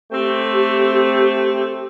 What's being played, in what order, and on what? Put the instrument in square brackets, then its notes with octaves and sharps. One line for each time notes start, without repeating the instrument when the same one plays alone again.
[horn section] A3 C4 [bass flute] G4